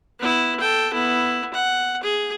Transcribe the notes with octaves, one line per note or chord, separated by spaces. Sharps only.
B3 E4
A4 G5
B3 E4
F#5
G#4